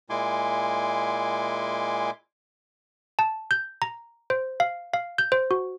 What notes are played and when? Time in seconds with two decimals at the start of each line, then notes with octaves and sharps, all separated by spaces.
0.10 A#2 G#3 E4 G#5 C6 D6
3.19 A5
3.51 G6
3.82 A#5
4.30 C5
4.60 F5
4.94 F5
5.18 G6
5.32 C5
5.51 F#4